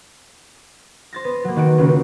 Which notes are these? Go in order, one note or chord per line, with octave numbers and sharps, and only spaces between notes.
C5 A6 A#6
B3
F#3 A#3
D#3 F#4 D7
C#2 C#3